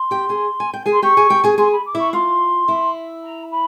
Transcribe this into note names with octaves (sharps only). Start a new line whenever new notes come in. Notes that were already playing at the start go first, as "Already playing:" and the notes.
Already playing: C6
G4 G5
G#4 G#5
G#5
G5
G#4 G#5
C6
G4 G5 C#6
G#4 G#5
G4 G5
G#4 G#5
G#4 G#5 C6
B5
D6
E4 E5 C#6
F4 F5 C6
E4 E5
A#5
B5